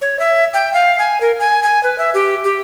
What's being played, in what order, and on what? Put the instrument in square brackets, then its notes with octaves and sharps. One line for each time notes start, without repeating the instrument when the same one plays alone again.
[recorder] C#5
E5
G5
F5
G#5
A#4
G#5
G#5
B4
E5
G4
G4